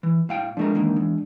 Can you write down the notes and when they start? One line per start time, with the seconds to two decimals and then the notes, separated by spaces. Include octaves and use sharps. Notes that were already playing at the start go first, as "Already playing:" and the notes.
0.03 E3
0.29 A2 F5 G5
0.57 F3 G#3 A3 D4 A#4
0.75 E2 D#3 A#3
0.96 E2